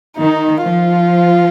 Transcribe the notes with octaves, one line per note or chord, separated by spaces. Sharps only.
D#3 D#4
F3 F4